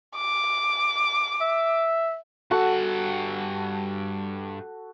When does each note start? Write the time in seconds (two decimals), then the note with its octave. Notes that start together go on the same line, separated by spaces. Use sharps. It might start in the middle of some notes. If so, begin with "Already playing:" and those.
0.16 D6
1.41 E5
2.51 G2 F#4 A4 F#5